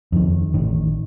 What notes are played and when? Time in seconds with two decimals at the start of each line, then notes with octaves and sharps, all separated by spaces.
0.12 F2 D#3
0.54 A1 D#3